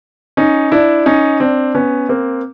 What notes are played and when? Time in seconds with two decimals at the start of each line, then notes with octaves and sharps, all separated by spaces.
0.37 C#4 D#4
0.72 D4 E4
1.06 C#4 D#4
1.40 C4 D4
1.75 B3 C#4
2.09 A#3 C4